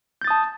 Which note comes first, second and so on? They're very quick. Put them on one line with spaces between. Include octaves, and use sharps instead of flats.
G6 A6 D#6 A5